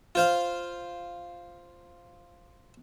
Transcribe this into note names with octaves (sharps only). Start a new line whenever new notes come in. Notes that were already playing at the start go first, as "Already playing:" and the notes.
F4 C5 F5